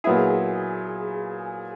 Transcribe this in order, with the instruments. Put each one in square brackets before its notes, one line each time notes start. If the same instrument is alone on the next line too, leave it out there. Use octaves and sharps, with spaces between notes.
[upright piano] A#2 F#3 B3 E4 [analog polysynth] G#4